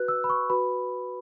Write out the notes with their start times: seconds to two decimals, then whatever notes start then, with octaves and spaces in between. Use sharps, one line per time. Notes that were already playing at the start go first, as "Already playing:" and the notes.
Already playing: F#4 B4 F#6
0.08 E6
0.24 B5
0.30 C#6
0.50 F#4 B4 B5